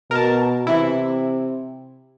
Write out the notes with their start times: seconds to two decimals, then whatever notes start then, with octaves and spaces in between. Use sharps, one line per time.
0.11 B2 A#4 A5
0.67 C3 E3 E4